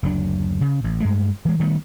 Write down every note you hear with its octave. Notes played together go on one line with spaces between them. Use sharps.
F#1 D2 F#3 D4
C#3
A1
G2 G#3 A3
E3 G#3
D#3 G3 A3 B3